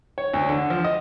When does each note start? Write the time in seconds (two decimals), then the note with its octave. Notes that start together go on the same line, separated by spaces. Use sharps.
0.18 C#5
0.34 D2
0.49 D3
0.70 F3
0.84 D#5